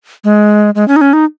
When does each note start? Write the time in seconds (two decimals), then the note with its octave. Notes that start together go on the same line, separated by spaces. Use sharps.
0.24 G#3
0.75 G#3
0.88 C#4
0.96 D#4
1.01 C#4
1.13 D#4